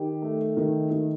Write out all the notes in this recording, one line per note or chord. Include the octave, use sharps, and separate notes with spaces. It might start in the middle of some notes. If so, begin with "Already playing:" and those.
Already playing: D#3 G4
A3
D#3
D#3